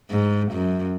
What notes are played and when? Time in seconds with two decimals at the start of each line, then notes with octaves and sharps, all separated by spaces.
0.11 G#2
0.52 F#2